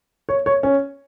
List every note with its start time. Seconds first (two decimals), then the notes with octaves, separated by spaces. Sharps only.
0.29 C#5
0.46 C#5
0.63 C#4